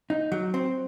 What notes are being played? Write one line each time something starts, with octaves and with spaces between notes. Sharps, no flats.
D#4
F#3
C4